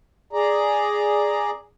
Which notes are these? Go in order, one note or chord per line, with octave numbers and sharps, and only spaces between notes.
G#4 D5 A#5